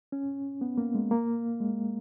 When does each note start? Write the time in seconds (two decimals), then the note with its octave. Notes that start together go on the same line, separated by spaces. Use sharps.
0.12 C#4
0.61 B3
0.78 A#3
0.95 G#3
1.11 A#3
1.60 G#3